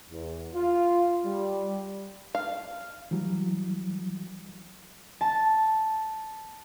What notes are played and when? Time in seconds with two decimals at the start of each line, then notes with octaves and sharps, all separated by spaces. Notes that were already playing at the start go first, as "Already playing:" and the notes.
0.10 E2
0.55 F4
1.25 G3
2.35 F5
3.11 E3 F#3 G3
5.21 A5